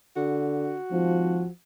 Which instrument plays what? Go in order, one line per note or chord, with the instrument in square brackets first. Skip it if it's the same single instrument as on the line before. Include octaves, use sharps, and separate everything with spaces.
[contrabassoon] D3 [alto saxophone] F#4
[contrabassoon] G#1 [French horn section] F3